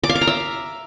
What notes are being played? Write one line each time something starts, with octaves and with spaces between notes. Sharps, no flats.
D6
F5
D6
A#5
E5